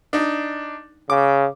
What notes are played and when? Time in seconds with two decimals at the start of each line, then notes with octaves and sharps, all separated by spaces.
0.13 D4 D#4
1.10 C#3 D6